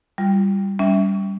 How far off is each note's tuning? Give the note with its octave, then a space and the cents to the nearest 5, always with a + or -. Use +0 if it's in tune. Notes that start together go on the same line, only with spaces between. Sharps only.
G3 +0 F4 +0
G3 +0 C#4 +30 E5 +0